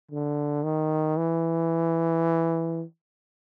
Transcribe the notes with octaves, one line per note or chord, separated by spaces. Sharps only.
D3
D#3
E3